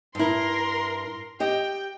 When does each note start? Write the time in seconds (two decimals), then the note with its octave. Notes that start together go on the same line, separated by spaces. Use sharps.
0.15 G2 E4 A#4 C6
1.40 G4 D#5 G5